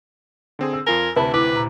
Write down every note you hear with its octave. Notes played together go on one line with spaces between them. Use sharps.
D3 C4 G#4
E6
F2 F4 A#4 G#5
D2 C3 E4 B4 A5 B5
E4 B4 D6
A#2 A#5